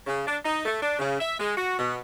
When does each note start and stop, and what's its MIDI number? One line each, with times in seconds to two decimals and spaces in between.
0.07 0.22 49
0.26 0.37 62
0.44 0.62 63
0.65 0.80 57
0.82 0.96 62
0.99 1.15 49
1.19 1.36 76
1.39 1.56 56
1.56 1.76 66
1.78 1.98 47